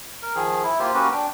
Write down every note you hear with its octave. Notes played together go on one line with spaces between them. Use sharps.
A#4
D#3 F3 G#4
E4
A#3 F4 G4 C5
A#3 C#4 F#4 G4 B4
D4 G5